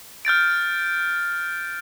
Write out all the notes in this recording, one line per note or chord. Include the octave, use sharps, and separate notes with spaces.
F6 G6 A6 D7